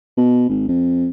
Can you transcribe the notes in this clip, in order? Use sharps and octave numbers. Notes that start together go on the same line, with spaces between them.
B2
G#1
F2